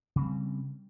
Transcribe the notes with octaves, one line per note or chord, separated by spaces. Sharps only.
C#3 G3 C4